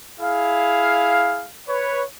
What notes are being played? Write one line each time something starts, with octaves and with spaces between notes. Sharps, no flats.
E4 G#4 F5
B4 C#5